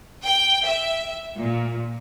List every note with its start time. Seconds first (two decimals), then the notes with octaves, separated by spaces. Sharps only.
0.25 G5
0.67 E5
1.38 A#2